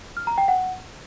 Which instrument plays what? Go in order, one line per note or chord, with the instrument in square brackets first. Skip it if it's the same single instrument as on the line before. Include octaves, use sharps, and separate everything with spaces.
[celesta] F6
A#5
G5
F#5